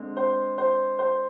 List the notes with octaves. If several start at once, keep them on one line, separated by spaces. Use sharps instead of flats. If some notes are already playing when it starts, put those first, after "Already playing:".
Already playing: D3 G#3 C4
C5
C5
C5